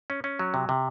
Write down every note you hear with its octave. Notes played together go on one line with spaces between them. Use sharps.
C#4
C#4
F#3
C3
C3